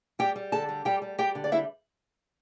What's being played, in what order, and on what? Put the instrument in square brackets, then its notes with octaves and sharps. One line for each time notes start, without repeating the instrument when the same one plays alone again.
[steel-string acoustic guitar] G3 G4 G5
G3
D3 A4 A5
G3
G3 G4 G5
G3
G3 G4 G5
D3
D5
G3 E4 E5